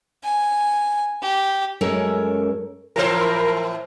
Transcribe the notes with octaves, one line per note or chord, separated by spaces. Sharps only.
G#5
G4
F#2 G#3 C#4 A4 A#4 C#5
A2 E3 A#4 C5